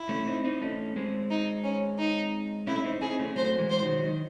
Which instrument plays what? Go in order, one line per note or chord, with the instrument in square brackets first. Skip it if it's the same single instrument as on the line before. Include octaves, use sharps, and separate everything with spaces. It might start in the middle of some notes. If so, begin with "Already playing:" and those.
Already playing: [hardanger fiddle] E4
[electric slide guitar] A3 C#4
C4 D#4
C4 D#4
A3 C#4
G#3 C4
[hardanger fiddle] D#4
C#4
D#4
[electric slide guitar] A3 C#4 [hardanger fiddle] E4
[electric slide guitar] C4 D#4
[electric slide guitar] C4 D#4 [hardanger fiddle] G#4
[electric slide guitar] A3 C#4
[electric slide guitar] F#3 A3 [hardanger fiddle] C5
[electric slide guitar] E3 G#3
[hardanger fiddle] C5
[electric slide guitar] D#3 F#3
D#3